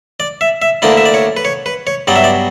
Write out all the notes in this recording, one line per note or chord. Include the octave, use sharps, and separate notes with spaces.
D5
E5
E5
D2 D3 A#3 E4 D5
E5
D5
C#5
B4
C#5
B4
C#5
G2 F#3 B3 D5
E5
D5